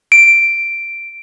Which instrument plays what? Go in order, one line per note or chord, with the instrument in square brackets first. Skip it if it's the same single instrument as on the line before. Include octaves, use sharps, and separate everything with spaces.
[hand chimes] D7